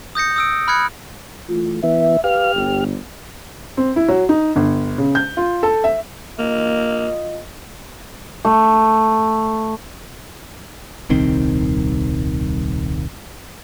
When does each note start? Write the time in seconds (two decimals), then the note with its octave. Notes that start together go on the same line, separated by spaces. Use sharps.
0.15 D#6 G6 A#6 C#7
0.36 D#6 E6 D7
0.68 B5 F6 F#6 G#6 C#7
1.49 E3 A3 F4
1.84 E3 B3 E5
2.24 G4 B4 F5 F6
2.55 G1
3.77 C4
3.96 E4
4.08 F#3
4.29 D#4
4.56 G1
4.98 C#3
5.15 G6
5.37 F4
5.63 A4
5.84 E5
6.39 A#3 F4 D#5
8.45 A3
11.09 D#1 C2 D#3 C4